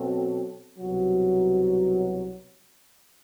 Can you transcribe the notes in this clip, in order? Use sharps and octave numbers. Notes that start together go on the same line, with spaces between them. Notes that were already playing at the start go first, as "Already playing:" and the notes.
Already playing: B2 F#3 C4 F#4 A4
C2 B2 F#3